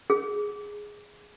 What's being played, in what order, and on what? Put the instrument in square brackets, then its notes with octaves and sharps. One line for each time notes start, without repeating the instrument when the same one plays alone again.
[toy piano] G#4